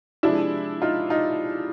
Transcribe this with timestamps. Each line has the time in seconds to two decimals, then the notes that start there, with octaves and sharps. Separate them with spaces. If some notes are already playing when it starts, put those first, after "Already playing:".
0.23 C3 F3 G#3 D4 E4
0.82 D#4 F4
1.10 D#4 F4